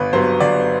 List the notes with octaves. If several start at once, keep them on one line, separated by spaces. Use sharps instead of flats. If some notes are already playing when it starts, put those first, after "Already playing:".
Already playing: G1 B4
G2 F#3 B3 C5
G1 D5